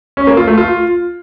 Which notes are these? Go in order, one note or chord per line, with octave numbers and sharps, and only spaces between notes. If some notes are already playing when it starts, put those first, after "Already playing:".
C#4
A#3
F4
A3
F4